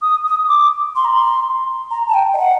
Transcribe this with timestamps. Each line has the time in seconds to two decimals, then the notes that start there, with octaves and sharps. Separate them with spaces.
0.02 D#6
0.27 D#6
0.48 D6
0.96 C6
1.05 A#5
1.15 C6
1.91 A#5
2.08 A5
2.14 G5
2.34 D#5
2.38 F#5